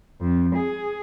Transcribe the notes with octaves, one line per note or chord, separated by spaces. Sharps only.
F2
G#4